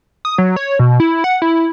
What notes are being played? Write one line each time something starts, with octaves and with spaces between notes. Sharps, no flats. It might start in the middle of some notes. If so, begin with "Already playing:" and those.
D#6
F#3
C#5
B2
E4
F#5
E4